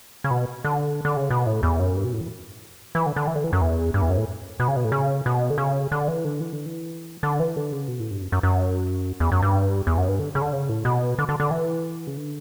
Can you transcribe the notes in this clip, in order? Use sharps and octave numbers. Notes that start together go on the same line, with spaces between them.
C#3
B2
D3
D3
C#3
B2
A2
E2
F#2
G2
B2
A2
E3
E3
D3
D3
E3
D3
E3
F#2
E2
G2
E2
F#2
A2
B2
C#3
B2
A2
C#3
B2
D3
C#3
D3
E3
D3
E3
D3
E3
D3
E3
D3
C#3
B2
A2
G2
F#2
F#2
F#2
E2
F#2
G2
E2
F#2
G2
D3
C#3
D3
C#3
A2
B2
D3
D3
D3
E3
C#3
D3